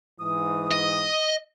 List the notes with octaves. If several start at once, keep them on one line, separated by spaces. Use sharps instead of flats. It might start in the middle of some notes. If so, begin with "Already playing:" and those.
G#2 E3 D#6
D#5